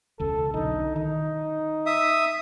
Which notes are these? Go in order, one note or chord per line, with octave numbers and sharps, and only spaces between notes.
E1 C#2 A4
B1 D3 D#4
D#3 D#4
E5 D#6